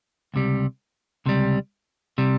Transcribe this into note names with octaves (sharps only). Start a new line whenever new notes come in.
C#2 C3 G3
C#2 C3 G3
C3 G3